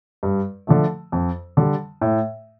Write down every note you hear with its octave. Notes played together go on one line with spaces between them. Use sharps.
G2
D3 F3 A3
F2
D3 G3
A2